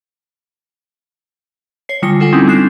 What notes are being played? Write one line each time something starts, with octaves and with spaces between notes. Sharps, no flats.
C#5 C7
D3 G3 G#3 F4 A#6 C#7
F4 A4 F#5 G#5
G3 G#3 C4 C#4 D#4 E4
G#3 C4 D4 F#6 C7 E7